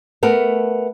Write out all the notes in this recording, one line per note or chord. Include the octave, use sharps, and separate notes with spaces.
A3 B3 A#4